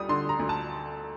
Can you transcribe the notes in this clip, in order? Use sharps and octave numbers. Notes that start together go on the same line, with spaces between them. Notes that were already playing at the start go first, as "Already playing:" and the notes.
Already playing: D2 G3 D#6
D3 C6
A#5
D2
A5